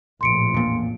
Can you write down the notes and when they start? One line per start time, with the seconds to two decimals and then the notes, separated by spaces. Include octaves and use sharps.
0.21 A#1 F2 A2 C6 C#7 D7
0.54 E2 A#2